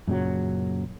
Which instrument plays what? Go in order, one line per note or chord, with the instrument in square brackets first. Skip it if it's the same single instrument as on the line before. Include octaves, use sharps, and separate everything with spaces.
[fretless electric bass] F#2 A#2 C#3 F#3